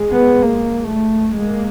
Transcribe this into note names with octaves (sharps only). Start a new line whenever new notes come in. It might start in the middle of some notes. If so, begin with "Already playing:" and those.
Already playing: G#3
B3
A#3
A3
G#3 A#3